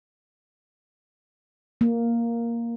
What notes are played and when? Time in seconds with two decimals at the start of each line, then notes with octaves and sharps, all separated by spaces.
1.81 A#3